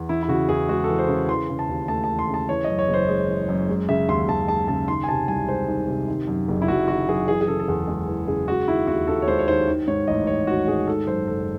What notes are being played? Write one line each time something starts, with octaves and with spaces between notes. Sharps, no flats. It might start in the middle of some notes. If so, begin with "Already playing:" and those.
Already playing: E2
E3 E4
E4
C#3 F#4
E2 G#4
G#3 F#4
A4
E3
C5
C#3
E3 C6
C#3
A5
D#2
A3 A5
A5
E3
C6
C#3 A5
E3 C#5
F#2 D#5
C#5
F#1 C5
G#3
E3
F#2
G#3
C#3 E5
D#2 C6
D#2 A5
G#3 A5
C#3 A5
D#3 C6
G#5
C3 A5
C2 G#5
G#3 C5
D#3
C3
D#3
F#2
F#1
E4
F#1 F#4
D#3 F#4
F#2 G#4
E3 G#4
G#4
C#3 A4
A4
E2 G#4
G#3
E3
C#3 G#4
G#3 F#4
D#3 E4
D#2 F#4
D#2 A4
C#5
G#3 C5
C#5
D#3 C5
D#3
G#2 C#5
A1 D#5
A1 C#5
D#3 F#4
G#2 G#4
D#3 A4
F#2 C5
F#1 A4